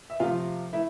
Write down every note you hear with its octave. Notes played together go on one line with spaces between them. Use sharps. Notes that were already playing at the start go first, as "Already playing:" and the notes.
E5
C3 F3 A3 F4 F5
A3 E4 E5